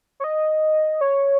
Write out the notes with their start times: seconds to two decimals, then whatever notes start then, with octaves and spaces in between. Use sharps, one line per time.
0.20 C#5
0.24 D#5
1.01 C#5